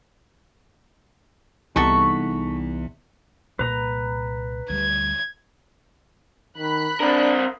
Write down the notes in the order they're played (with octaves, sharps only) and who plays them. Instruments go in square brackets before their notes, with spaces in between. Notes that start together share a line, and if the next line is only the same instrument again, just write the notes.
[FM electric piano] C2 D#4 B6 [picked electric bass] E3 B3 [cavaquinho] F#4 A4 C#6
[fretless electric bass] C2 A#2 A#3 [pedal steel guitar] B4 A#5
[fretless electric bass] D2 G3 [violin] G#6
[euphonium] D#3 [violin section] B5 F#6
[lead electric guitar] C4 A#4 [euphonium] D4